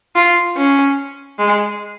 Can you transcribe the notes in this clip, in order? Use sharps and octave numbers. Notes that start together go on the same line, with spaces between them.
F4
C#4
G#3